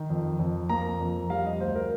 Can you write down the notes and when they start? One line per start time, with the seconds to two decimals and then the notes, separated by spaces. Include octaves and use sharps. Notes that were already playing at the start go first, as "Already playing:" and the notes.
Already playing: D#3
0.10 F2
0.39 F2
0.69 A#3 A#5
1.00 F2
1.30 G3 F5
1.45 D#5
1.60 D2 C5
1.76 A#4